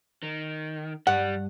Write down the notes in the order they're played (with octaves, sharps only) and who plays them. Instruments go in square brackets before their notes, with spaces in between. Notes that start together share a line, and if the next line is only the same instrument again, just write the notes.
[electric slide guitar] D#3
[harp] G2 [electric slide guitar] G3 [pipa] F#5